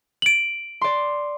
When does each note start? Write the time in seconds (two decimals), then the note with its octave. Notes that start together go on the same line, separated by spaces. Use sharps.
0.22 D7 F#7
0.81 D5 C6